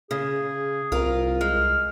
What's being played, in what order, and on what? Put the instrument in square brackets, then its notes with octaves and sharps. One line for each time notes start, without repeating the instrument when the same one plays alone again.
[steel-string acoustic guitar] C#3 [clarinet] G#4
[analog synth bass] C2 [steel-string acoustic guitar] F4 A#4
[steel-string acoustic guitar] G#3 [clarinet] F6